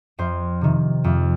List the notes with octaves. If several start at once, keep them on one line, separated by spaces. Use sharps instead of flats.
F2 C5
C3 D#3
F2